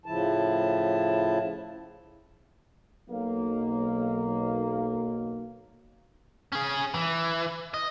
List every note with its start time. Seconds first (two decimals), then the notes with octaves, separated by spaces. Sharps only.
0.06 A2 C#3 F3 E4 A5
3.09 B1 A#3
6.52 C#4 G#4
6.94 E3
7.74 D#5